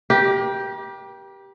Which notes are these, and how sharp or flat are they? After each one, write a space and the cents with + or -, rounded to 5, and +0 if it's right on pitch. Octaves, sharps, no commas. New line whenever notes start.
G4 +0 A#4 +45